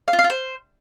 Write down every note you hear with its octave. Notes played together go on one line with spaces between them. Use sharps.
F5
F4
F5
F4
C5